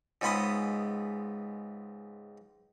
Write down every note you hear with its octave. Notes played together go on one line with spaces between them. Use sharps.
C#2 G#2 B3 B5 C6 D#6